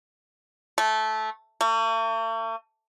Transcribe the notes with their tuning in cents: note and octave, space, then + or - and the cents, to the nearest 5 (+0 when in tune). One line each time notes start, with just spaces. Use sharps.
A3 -15
A3 +45